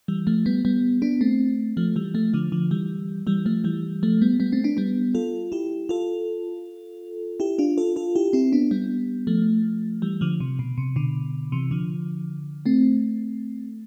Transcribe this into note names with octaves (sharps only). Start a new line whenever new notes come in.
E3 G3
F3 A3
G3 B3
G3 B3
B3 D4
A3 C4
F3 A3
E3 G3
F3 A3
D3 F3
D3 F3
E3 G3
E3 G3
F3 A3
E3 G3
F3 A3
G3 B3
G3 B3
A3 C4
B3 D4
G3 B3
F4 A4
E4 G4
F4 A4
E4 G4
D4 F4
F4 A4
F4 A4
E4 G4
C4 E4
B3 D4
G3 B3
F3 A3
E3 G3
D3 F3
C3
B2
C3
B2 D3
C3 E3
D3 F3
A3 C4